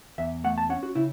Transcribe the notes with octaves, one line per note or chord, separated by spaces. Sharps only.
E2 E5
A3 F#5
A5
C#4 F#5
F#4
C#3 E4